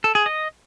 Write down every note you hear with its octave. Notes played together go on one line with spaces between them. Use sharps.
A4
G#4
D#5